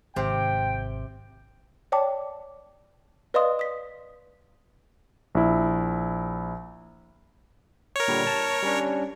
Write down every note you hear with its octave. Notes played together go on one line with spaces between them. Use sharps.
G#1 C3 C5 G5
C#5 D5 G5 A5 D6
B4 D5 D#5 F5 C6 D#6
D#6 B6
A#1 E4
A#4 C#5
A#2 D3 G3
A5
G3 C#4 D4